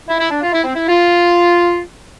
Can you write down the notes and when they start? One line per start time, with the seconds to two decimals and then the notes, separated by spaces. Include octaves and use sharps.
0.08 E4
0.19 E4
0.30 D4
0.42 F4
0.53 E4
0.64 C4
0.75 E4
0.87 F4